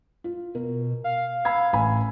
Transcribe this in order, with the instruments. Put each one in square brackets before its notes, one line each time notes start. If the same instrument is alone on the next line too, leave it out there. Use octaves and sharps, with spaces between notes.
[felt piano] F4
[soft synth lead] B2 [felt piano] A#4
[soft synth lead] F5
[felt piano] B5 E6 G#6
A1 G#5 B5